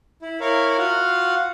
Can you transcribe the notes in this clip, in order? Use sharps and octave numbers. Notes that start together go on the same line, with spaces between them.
E4
E4 A#4 C#5 F5
F4 F#4 F5 F#5